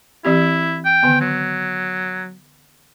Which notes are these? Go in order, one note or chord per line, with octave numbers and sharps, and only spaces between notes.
E3 C4 E4 G4
G5
D3 D#3 B3
F#3